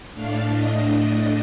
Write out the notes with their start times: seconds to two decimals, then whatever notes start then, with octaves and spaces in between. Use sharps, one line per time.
0.13 A2 A3 D4 F5
0.51 D#5